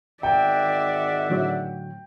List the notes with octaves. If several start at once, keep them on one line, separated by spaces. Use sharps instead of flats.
G#1 D#4 D5 E5 F#5 G5
A2 D3 F#3